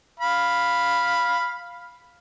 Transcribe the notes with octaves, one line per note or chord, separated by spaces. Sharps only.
F5 B5